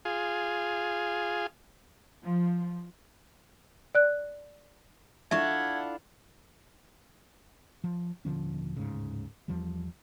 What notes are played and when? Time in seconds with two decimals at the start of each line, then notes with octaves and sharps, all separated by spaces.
0.05 F4 G#4
2.24 F3
3.95 D5 F#6
5.31 D4 E4 F4 A4 E5 F#5 C#6 G#6
7.84 F3
8.25 D#1 D3 F3 C#4
8.77 D1 G#2 C#3
9.48 E2 F3 G3